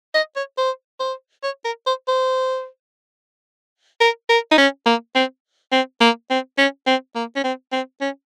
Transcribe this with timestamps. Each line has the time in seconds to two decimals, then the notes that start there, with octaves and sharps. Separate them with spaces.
0.15 D#5
0.36 C#5
0.58 C5
1.00 C5
1.44 C#5
1.65 A#4
1.87 C5
2.08 C5
4.01 A#4
4.29 A#4
4.51 D#4
4.58 C#4
4.86 A#3
5.15 C4
5.72 C4
6.01 A#3
6.30 C4
6.58 C#4
6.87 C4
7.15 A#3
7.36 C#4
7.44 C4
7.72 C4
8.01 C#4